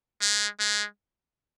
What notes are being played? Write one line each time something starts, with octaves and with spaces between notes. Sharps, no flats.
G#3
G#3